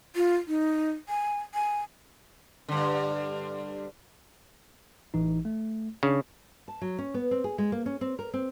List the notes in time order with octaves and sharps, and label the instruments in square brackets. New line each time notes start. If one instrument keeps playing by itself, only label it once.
[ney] F4
D#4
G#5
G#5
[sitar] G2 D3
[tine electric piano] A1 E3 D#4
A3
[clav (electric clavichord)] C#3 [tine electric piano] D4
[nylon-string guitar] A5
F#3
C#4
B3
C4
G#4
G#3
A#3
C#4
C4
A#4
C4